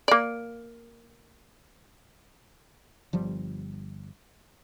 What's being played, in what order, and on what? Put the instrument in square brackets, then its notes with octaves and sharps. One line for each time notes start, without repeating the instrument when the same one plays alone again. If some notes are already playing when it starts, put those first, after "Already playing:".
[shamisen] A#3 D5
[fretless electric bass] G1 F3 G3